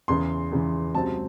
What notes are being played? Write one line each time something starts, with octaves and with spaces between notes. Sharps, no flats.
E2 C#3 E3 C6
E2 C#3 E3
C#2 C3 F#3 C4 A5